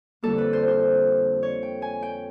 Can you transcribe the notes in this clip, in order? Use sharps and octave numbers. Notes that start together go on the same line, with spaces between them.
F2 D3 G3 A#3 A4
B4
C5
C5
C#5
G5
G#5
G5